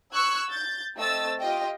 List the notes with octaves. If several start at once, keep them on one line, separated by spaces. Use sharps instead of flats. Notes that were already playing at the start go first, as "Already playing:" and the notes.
C#6 E6 F#6 G#6
G6 A6
A3 C4 D#5 E6 A6
F4 G4 D#5 G5